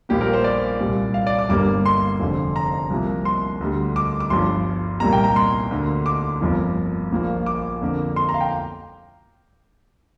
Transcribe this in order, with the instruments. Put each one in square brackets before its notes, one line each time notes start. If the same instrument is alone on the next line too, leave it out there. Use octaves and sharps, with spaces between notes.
[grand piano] A#1 A#2 G3 A#3 G4
A#4
C5
D5
C2 A#2 G3
F5
D5
D6
G1 G2 D3 G3 A#3 D6
C6
F1 F2 D3
A#5
C2 C3 F3 A#3
C6
D2 D3 G3
D6
D6
G1 G2 F3 C6
C2 A#2 G3 A#3 A#5
G5
A#5
C6
D2 D3 A#3
D6
G1 F2 F3 A#3
A#1 A#2 F3 A#3
D6
F2 D3 A#3
C6
A#5
F5
G5